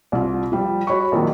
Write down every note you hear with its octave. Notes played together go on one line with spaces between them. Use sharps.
C2 F4
F3 G3
F#4 C#5 B5 C#6
A#1 D#3 F3 F#3